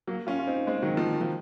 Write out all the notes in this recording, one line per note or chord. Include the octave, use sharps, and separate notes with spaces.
F#3 A#3
C#4 F4
F4
C4 D#4
G#3 C4
D#3 F#3
F3
D#3
F3